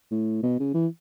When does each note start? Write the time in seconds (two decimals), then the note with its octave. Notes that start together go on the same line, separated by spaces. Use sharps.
0.11 A2
0.43 B2
0.59 C#3
0.74 E3